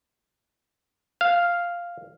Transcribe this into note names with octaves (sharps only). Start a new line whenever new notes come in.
F5